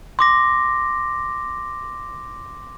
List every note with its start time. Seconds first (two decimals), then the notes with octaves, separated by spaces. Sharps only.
0.19 C6 D6 A#6